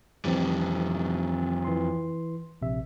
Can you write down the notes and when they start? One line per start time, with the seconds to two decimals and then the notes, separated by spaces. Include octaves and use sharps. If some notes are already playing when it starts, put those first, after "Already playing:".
0.25 F2 E3 G3 C4
1.65 E3 C6
2.62 A#1 C3 E5